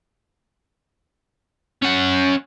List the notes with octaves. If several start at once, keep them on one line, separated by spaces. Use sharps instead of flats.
C#4 F#5